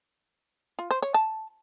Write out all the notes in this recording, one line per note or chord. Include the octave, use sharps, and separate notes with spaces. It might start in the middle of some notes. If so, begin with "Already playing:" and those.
F4
C5
C#5
A5